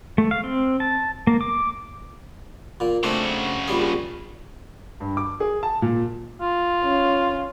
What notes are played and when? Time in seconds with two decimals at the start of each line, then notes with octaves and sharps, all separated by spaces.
0.18 A3
0.31 F5
0.44 C4
0.80 A5
1.27 A#3
1.41 D6
2.80 A#2 A#3
3.03 C#3 A3 C4 D4 F#4
3.68 A#1 G3 G#4
5.00 G2
5.17 D6
5.40 G#4
5.63 A5
5.82 A#2
6.41 F4
6.84 C#4 F5